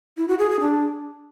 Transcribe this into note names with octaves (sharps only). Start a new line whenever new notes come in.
E4
F#4
G#4
G#4
D4